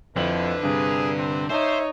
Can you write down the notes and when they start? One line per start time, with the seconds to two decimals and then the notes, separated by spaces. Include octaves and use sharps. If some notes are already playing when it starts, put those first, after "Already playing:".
0.16 F2 D3 A3 E4 B4 F#7
0.63 G2 C3 G#4
1.17 C4
1.49 D#4 C5 C#5 E5